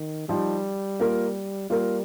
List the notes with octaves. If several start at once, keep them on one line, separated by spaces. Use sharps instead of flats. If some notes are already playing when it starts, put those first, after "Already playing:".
Already playing: D#3
F3 G3 D#4 G4
A#3 F4 A#4
G3 A#3 F4 A#4